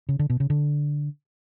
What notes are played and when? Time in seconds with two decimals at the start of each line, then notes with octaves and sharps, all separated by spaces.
0.09 C#3
0.19 D3
0.30 B2
0.40 C#3
0.50 D3